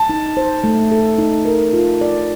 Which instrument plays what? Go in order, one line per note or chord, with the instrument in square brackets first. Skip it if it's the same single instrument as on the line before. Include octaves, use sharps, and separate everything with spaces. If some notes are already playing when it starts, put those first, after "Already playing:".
Already playing: [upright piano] A5
[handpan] D#4
C5
A3
A4
D#4
A#4
F4
D5